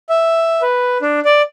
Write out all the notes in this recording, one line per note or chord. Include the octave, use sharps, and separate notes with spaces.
E5
B4
D4
D5